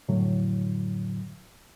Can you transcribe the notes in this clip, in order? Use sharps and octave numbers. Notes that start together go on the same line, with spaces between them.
F2 A2 D3 F#3